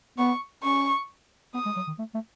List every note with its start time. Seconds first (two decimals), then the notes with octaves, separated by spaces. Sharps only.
0.18 B3 C#6
0.63 C#4 C#6
1.54 B3 D#6
1.65 G#3
1.76 F#3
1.87 D#3
1.99 A3
2.14 A3